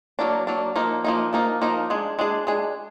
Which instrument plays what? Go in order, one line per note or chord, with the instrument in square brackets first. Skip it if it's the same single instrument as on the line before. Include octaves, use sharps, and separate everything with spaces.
[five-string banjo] F#3 A#3 D4
F#3 A#3 D4
F3 A#3 D#4
F3 A#3 D#4
F3 A#3 D#4
F3 A#3 D#4
G#3 D4 G#4
G#3 D4 G#4
G#3 D4 G#4